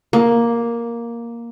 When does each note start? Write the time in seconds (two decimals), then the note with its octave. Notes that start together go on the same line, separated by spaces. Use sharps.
0.13 A#3